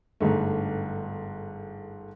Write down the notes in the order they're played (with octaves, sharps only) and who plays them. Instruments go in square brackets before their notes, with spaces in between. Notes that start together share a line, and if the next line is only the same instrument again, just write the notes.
[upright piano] G1 G#2 A3